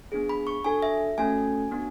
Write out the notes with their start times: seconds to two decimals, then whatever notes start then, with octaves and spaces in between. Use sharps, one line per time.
0.12 B3 D4 G#4
0.29 B5
0.47 C#6
0.65 D4 F#4 A4 G#5
0.82 E5
1.18 A3 C#4 F#4 A4 G#5
1.71 B3 D4 F#4